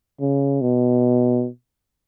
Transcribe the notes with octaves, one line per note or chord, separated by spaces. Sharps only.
C#3
B2